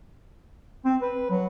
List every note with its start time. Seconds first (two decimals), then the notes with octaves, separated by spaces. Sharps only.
0.85 C4
1.02 B4
1.31 F#3